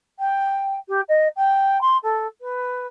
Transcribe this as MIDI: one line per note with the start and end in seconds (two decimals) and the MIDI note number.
0.19 0.76 79
0.88 1.01 67
1.08 1.28 75
1.36 1.80 79
1.81 1.97 84
2.03 2.27 69
2.41 2.86 71